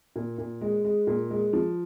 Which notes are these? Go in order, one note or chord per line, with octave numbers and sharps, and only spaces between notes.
A#2
A#2
G#3
G#3
A#2
G#3
F3